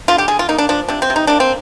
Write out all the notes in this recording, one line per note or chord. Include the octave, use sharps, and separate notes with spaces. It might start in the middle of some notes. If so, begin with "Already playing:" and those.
D3 F4
G4
D3 G#4
F4
A#3 D#4
D4
F3 D4
C3 D4
C4
C3
D#4
A#3 D4
C4